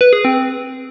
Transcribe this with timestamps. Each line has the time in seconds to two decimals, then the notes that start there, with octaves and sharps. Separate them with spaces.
0.01 B4
0.13 G#4
0.25 C4